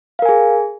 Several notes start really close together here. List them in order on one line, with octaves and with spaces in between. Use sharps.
F5 A#4 G#5 G#4